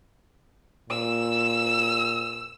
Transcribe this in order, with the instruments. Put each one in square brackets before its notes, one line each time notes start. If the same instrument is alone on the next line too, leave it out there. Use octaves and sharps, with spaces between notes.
[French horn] A#2 [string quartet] E6